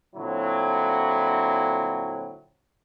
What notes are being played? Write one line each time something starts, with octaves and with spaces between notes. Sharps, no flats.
A#2 D3 F#3 C4 E4